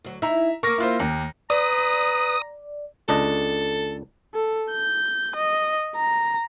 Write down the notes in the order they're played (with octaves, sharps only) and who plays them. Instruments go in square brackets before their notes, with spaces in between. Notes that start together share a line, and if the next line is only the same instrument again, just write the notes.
[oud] D2 F#3
[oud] D#4 E4 [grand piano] E5 A#5
[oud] A#3 A#4 [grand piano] C#6 D6 A#6
[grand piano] E4 F4 C5
D#2
[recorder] B4 [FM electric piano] D5 [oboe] A#5 [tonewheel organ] D#6
[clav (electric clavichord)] C#2 D4 D#5 [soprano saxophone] A4
[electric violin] A4
G6
D#5
A#5